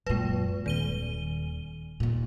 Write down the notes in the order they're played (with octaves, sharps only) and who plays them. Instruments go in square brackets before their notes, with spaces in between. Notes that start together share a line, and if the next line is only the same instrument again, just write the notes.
[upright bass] F#2 A#2 [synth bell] G#3 B4
[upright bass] D#1 [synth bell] D#3 D#7 G7
[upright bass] D#2 A#2